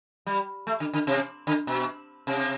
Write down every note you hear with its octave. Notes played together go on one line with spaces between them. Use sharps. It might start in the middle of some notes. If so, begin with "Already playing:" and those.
G3
A3
D3
D3
C3
D3
B2
C3